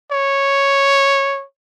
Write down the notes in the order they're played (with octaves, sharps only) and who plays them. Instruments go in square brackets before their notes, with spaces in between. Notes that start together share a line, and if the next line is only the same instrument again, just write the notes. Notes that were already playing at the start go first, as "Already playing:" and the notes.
[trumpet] C#5